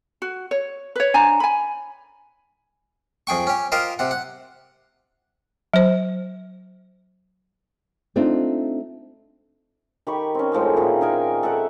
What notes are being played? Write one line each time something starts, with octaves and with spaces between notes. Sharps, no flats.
F#4
C#5
B4 C#5
D4 C5 G#5 A#5
G#5 B5
F2 G#4 G5 C#6
C#4 G4
F4 G4 A#4 C5 D#5
C3 F#5
F#5
F#3 C5
A3 C4 D4 D#4 F4
D#3 G4 B5 C#6
C4 C#4
A2 F3 G#3 D#4
A#2 D#3 A#3 E4
D#4 G#4 A#4 G#5
A4 E5 F#5 G5